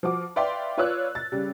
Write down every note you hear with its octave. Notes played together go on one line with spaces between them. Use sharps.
F3 F#4 D6
B4 D5 E5 F5 G5 C6
F4 B4 C#5 D5 E6 F#6
A6
C#3 G3